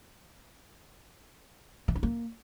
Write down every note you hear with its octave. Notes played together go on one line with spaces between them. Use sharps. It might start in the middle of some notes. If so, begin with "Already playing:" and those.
E3
D#4
A#3